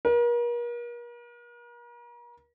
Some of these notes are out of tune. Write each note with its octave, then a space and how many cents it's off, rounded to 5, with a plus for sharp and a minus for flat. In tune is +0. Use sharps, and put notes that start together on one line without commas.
A#4 +40